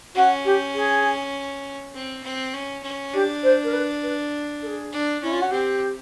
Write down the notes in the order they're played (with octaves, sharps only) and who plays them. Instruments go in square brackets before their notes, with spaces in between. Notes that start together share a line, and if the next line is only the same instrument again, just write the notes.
[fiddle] C#4 [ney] F#4
[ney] G4
G#4
[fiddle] C4
C4
C#4
C#4
[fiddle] D4 [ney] G4
[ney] C5
A#4
B4
B4
A4
G#4
[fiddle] D4
[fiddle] C#4 [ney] E4
[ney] F4
F#4
[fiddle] C4 [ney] G4